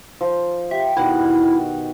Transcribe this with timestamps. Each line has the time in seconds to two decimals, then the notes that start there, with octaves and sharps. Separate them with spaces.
0.21 F3
0.71 G4 E5
0.97 B2 D#3 E4 F#5